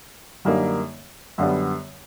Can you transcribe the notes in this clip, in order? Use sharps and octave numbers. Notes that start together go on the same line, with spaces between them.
F#2 D3 G3 A#3 D#4
F#2 D3 G3 B3